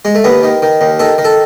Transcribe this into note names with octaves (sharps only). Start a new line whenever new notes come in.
G#3
A3
D#2 B3
D#3
D#3
D#2
D#3 A4
D#3
A4